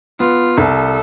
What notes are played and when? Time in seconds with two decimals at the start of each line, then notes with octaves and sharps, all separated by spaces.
0.20 B3 F4
0.58 C2 A4